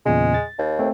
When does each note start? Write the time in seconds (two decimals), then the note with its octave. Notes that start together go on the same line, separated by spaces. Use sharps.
0.06 E2 A#2 C#3 G#3
0.34 A6
0.58 D#2
0.79 A3 C4